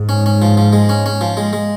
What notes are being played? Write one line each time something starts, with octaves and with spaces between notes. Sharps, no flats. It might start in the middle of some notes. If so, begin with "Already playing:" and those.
Already playing: G#2
C#4
C#4
F3
F3
G#3
C#4
C#4
F3
G#3
G#3